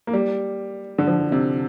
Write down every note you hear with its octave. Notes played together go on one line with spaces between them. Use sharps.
A#3
G3
D3
F3
C3